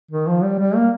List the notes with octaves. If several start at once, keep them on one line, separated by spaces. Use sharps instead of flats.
D#3
F3
G3
G3
A#3